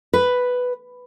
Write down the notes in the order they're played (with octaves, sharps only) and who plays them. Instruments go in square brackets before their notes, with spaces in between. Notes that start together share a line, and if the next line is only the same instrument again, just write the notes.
[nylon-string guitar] B4